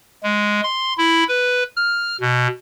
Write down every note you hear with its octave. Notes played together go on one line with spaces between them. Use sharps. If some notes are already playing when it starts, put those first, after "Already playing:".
G#3
C6
E4
B4
F6
B2